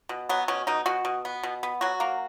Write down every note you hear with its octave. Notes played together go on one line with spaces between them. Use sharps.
B2
F#3 B3
B2 C#4
B2 D#4
B2 F#4
B2
B3
B2
B3
F#3 F#4
A#3